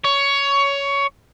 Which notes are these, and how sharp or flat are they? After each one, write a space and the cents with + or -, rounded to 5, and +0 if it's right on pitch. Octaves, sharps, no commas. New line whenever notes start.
C#5 +15